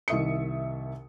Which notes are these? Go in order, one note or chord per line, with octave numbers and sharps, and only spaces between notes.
C2 D#3 E5 D#6 C#7